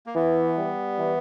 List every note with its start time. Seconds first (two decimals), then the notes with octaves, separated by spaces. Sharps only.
0.06 A#3
0.15 E3 B3
0.57 G3
0.99 E3